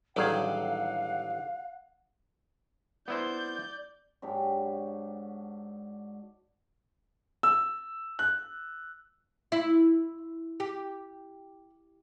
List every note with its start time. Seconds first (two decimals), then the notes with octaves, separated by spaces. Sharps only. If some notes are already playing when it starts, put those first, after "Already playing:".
0.16 A1 D3 D#3 F#3 G3 G#4 F5 F#5
3.08 B3 E4 C5 D5 G6
4.22 G#2 F#3 D4 G4
7.43 E6
8.19 F#6
9.52 E4
10.60 G4